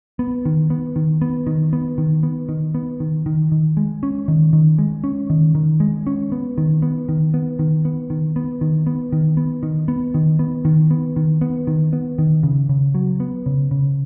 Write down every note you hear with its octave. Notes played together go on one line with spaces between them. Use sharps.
B3
D#3
B3
D#3
B3
D#3
B3
D#3
B3
D#3
B3
D#3
D#3
D#3
G#3
C#4
D#3
D#3
G#3
C#4
D#3
D#3
G#3
C#4
B3
D#3
B3
D#3
B3
D#3
B3
D#3
B3
D#3
B3
D#3
B3
D#3
B3
D#3
B3
D#3
B3
D#3
B3
D#3
B3
D#3
C#3
C#3
F#3
B3
C#3
C#3